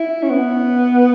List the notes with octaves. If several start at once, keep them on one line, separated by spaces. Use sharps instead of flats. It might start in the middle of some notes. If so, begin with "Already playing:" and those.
Already playing: E4
C#4
B3